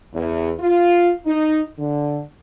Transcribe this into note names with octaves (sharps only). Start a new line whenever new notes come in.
E2
F4
D#4
D3